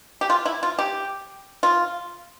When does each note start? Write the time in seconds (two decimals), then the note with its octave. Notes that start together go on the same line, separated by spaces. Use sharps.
0.21 G4
0.30 F4
0.45 E4
0.63 F4
0.79 G4
1.63 F4